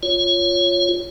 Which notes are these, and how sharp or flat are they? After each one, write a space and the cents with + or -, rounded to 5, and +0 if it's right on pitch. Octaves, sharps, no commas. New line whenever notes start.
F4 +0 C#5 +0